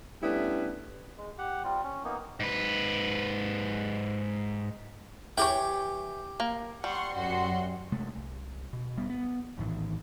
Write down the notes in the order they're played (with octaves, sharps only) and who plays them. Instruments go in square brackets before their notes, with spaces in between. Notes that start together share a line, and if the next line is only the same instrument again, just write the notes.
[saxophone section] G3 A3 B3 C#4 D4 E4
[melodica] G#3
G4 F#5
G3 C4 F4
C#4
A#3 B3 D#4
[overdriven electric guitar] G#2 B4
[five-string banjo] E3 C#5 [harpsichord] G4 G5
[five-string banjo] A#3
[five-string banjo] G3 [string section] F#5 C6 C#6
[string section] F#2 F#4 C6
[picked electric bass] C3 G#3 A3
C2
B2
D#1 G3 B3
B3
A#1 A2 D#3 E3